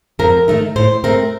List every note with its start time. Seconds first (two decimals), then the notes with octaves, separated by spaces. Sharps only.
0.19 F2 A#4
0.48 D#3 A3 D#4
0.76 A2 C5
1.04 A3 C4 A#4